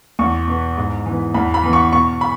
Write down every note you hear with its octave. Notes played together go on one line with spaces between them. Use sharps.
E2 C#6
B2 B3
G#2
E3 B3
E2 B5
B5
E3 B3
C#6
B2 C#6
B5